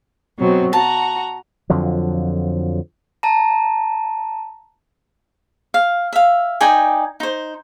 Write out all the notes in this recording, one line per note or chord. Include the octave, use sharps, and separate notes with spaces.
B2 F#3 C4
F#4 A5 A#5
F2 D3 F3 F#3
A5 A#5
F5
E5 F5
D#4 D5 G5 G#5
D#4 C5